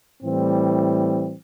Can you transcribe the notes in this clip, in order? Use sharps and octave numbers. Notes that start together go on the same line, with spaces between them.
A2 E3 G3 C4